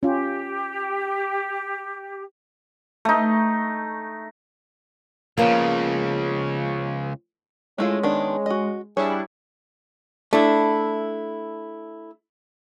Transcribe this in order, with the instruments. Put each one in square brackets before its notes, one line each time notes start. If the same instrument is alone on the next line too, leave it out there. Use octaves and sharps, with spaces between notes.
[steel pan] C#4 F4 [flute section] G4
[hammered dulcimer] A3 D#4
[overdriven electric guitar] C#2 C#3 [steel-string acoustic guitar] F3 B3 C#4 [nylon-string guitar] A#3
[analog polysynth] G#3 [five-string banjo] A3 E4 F4 [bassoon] C#4
[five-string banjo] D#3 B3 D4
F#4 D#5
[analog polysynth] G3 D4 E4 [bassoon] G#4 [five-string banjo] C#5
[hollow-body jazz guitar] A3 D4 E4